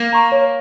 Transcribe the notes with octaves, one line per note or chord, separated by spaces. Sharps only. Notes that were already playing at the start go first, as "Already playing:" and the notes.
Already playing: A#3
A#5 C#6
C#5